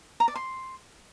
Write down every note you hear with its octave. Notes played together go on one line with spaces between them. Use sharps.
A#5
D5
C6